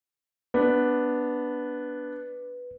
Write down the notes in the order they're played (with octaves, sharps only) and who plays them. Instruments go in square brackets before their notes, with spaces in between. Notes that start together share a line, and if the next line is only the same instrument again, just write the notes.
[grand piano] B3 D4 [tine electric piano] B4